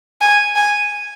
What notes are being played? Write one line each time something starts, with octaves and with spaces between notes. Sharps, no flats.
G#5
G#5